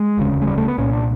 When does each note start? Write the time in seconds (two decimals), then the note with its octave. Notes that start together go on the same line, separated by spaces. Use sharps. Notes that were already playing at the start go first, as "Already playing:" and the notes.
Already playing: G#3
0.18 E1 D2 C#3
0.42 G#3
0.47 G3
0.58 A3
0.68 B3
0.78 C2 A#2 C#4
0.93 D4